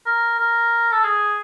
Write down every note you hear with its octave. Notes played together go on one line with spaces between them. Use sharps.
A#4
A#4
A4
G#4